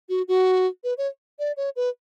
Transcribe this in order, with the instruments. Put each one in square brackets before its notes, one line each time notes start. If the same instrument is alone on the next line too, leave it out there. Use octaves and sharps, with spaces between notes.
[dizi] F#4
F#4
B4
C#5
D5
C#5
B4